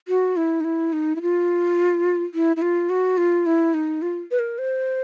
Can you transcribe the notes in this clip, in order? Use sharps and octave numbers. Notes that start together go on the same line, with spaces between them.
F#4
E4
D#4
E4
D#4
E4
F4
E4
E4
F4
F#4
F4
E4
D#4
F4
B4
A#4
C5